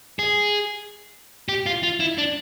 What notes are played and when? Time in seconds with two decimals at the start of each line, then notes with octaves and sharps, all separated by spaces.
0.19 G#4
1.49 G4
1.66 F4
1.83 F4
2.00 E4
2.18 D4